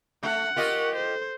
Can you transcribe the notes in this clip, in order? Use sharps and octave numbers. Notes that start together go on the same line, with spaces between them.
A3 F#5
F4 G4 A#4 D#5 C#6
A4 C5